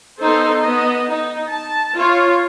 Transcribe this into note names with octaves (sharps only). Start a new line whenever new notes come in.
B3 D#4 A4 C5
B3 D#5
D#4
A5
F4 C#5